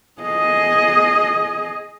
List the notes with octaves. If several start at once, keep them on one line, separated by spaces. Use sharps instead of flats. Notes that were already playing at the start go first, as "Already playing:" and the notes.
G#4 D#5